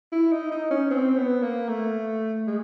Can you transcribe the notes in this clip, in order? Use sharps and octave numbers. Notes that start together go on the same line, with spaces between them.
E4
D#4
D#4
C#4
C4
B3
A#3
A3
G#3